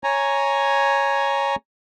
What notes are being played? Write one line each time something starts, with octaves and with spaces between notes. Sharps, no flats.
C#5 G#5 A#5